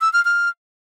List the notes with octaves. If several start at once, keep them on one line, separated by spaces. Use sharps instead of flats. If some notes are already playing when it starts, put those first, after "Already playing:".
E6
F6
F6